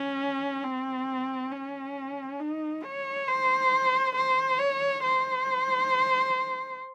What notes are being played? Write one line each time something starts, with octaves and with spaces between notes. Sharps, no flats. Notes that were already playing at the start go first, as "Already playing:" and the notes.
Already playing: C#4
C4
C#4
D#4
C#5
C5
C5
C#5
C5